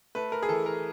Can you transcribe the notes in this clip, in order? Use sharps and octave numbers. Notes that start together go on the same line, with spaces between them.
A3 B4
A#4
G#4
E3 A4
A#4